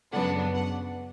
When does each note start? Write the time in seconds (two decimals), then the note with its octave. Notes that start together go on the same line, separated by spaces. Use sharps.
0.12 F#2 C#3 F#3 B3 D4 F#5
0.55 F#5